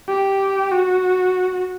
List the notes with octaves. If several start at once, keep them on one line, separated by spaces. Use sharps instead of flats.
G4
F#4